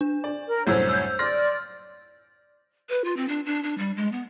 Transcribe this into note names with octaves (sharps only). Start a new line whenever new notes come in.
D4
D5
A#4
C2 F#2 A2 C5 C#5 E6 G6
E6 G6
D5 C6 F6 A#6
B4
F4
C4
D4
D4
D4
G3
G#3
B3